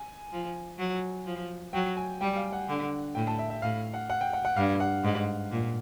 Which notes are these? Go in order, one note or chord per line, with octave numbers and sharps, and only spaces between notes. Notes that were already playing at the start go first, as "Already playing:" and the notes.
Already playing: G#5
F3
F#3
F3
F#3 G5
G#5
G3 G5
F5
F#5
D3
A2 G5
A5
E5
E5
A2 F5
F#5
F#5
G5
F#5
F#5
G2 F5
F#5
G#2
A#2